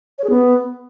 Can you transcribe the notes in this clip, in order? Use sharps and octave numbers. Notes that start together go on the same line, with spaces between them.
C#5
G#4
B3